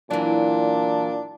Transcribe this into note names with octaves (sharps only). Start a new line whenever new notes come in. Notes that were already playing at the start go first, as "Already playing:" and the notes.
A#2 E3 F#3 D4